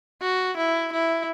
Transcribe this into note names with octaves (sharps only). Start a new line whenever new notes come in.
F#4
E4
E4